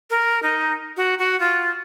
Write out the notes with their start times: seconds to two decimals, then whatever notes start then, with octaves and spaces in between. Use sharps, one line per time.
0.10 A#4
0.43 D#4
0.97 F#4
1.19 F#4
1.40 F4